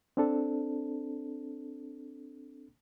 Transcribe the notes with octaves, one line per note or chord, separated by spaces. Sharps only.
C4 D4 A4